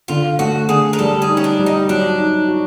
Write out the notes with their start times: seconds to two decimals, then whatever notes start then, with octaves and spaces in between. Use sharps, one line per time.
0.08 D3 F4
0.39 A3 F#4
0.68 D3 G#4
0.93 A#4
0.99 G3 A4
1.22 G#4
1.29 D#4
1.37 C#4
1.44 D4
1.59 G3
1.66 D#4
1.88 F#3 D4
2.18 D#4
2.48 F#4